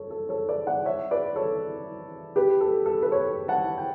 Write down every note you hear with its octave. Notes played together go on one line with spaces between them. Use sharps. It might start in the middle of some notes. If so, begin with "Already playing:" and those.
Already playing: A4 C#5
A4
A4 C#5
B4 D5
D5 F#5
C#5 E5
B4 D5
A4 C#5
G4 B4
A4
A4
B4
A4 C#5
F#5 A5
G5